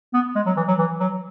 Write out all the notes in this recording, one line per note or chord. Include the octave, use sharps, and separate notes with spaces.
B3
G#3
F#3
E3
F#3
E3
F#3